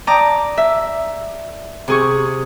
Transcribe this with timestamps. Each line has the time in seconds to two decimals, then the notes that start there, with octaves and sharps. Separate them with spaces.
0.07 D5 G5 A5 A#5 D6 D#6
0.58 E5
1.88 C3 G#4 C#6